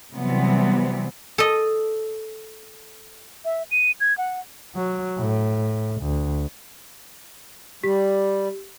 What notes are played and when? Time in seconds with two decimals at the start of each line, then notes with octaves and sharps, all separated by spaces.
0.14 C3 E3 F#3 G3 B3 C4
1.38 A4 D#5
3.45 E5
3.71 D#7
4.00 G#6
4.18 F#5
4.75 F#3
5.18 A2
6.02 D2
7.83 G3 G4 B6